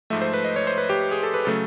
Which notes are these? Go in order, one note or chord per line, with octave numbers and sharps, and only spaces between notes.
G#2 F3 A3 E5
C5
B4
D#5
C#5
C5
B4
G4
G#4
A4
B4
C#3 F#3 A3 A4